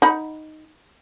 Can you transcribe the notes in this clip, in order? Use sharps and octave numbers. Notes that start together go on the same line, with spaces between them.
D#4 F#5 B5